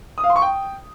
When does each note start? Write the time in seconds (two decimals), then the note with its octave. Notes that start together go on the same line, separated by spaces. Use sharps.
0.18 D#6
0.24 F5
0.30 C6
0.36 C#6
0.42 G5